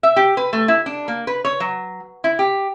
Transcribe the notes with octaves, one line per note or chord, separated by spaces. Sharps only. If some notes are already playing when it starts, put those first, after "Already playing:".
E5
G4
B4
A3
E4
D4
A#3
B4
C#5
F#3
E4
G4